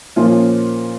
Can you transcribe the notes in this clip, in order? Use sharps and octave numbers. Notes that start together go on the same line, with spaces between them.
A#2 F3 A#3 C#4 F4